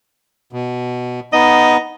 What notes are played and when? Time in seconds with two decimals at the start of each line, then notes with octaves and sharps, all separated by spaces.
0.53 B2
1.33 B3 D#4 D#5